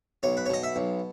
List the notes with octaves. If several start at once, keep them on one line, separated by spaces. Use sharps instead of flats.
B1 C#5
B4
C#5
B2 D#5
E5
B1